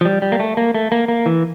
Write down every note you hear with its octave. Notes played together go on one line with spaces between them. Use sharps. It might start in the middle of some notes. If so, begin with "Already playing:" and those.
F3
G3
G3
A#3
A3
A#3
A3
A#3
A#3
E3